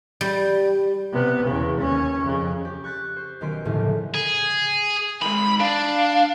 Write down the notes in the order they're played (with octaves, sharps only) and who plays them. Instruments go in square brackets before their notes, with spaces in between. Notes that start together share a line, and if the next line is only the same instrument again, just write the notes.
[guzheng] G3
[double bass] C3 B3
E2 C#3
D#2 C#4
F2 C#3
[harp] G4
C#6 F#6 A6 B6
C5
B1 D#3 C#4 C6 B6 D7
G1 D#2 A2 C#3 F3
[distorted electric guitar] G#4
[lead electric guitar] D#3 G#3 [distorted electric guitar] B5
[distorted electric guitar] D4 [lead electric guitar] F5